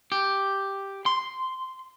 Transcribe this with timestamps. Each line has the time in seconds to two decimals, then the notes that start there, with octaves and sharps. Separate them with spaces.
0.12 G4
1.06 C6